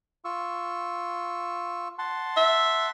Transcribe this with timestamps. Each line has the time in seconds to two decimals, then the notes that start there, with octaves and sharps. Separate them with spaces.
0.25 F4 C#6 E6
1.98 F#5 A5 C6
2.37 E5